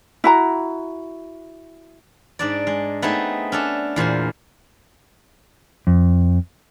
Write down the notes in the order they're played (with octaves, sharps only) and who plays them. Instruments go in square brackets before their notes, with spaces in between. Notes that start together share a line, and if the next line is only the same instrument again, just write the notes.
[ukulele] E4 F#4 A#5
[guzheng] G#2 D4 D5
G#3
A3 B3 C4 D#4 G#4
C#4 D4 A4
E2 A#2 C5 G#5
[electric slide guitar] F2